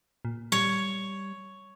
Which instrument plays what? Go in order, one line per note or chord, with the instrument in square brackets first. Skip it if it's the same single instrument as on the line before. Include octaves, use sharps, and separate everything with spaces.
[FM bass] A#2
[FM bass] G3 [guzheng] C#5